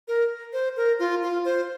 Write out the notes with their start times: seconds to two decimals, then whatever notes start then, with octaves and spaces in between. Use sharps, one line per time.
0.08 A#4
0.53 C5
0.77 A#4
0.99 F4
1.23 F4
1.45 C5